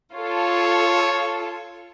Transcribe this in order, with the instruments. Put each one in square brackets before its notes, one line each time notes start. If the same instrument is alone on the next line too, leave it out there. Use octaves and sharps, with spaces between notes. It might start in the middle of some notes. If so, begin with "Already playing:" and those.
[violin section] F4 A4 [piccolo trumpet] C#5